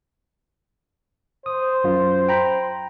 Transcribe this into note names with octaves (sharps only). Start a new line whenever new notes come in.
C5 D#6
F#2 F4
G5 A#5 B5